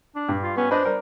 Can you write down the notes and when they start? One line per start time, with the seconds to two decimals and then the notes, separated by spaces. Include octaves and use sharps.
0.15 D4
0.29 G2
0.43 F4
0.57 B3 C#4
0.71 D4 B4 C5 D#5
0.85 G3 A#4